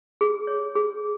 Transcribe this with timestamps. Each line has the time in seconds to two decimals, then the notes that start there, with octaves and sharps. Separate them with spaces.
0.21 G#4
0.47 C#5
0.75 G#4